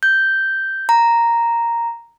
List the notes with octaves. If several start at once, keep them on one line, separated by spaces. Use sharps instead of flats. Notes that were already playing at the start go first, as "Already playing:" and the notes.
G6
A#5